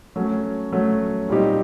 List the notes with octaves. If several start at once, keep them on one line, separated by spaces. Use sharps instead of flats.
F#3 A3 C#4
F#3 A3 C#4
A#2 G3 C4 D#4 G4